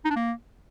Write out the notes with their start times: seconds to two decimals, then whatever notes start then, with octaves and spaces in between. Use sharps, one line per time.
0.05 D#4
0.10 D4
0.16 A#3